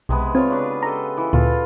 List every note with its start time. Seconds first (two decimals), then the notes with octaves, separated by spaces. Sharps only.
0.09 B1 C3 G#3 B3
0.35 C4 F4 C#5
0.50 C#3 D4 B4
0.83 G4 A4 D#5 A#5
1.17 E3
1.33 D2 A#2 F4 A4